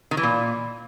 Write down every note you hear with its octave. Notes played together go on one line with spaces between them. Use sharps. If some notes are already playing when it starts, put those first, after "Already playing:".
D#3
E3
A#2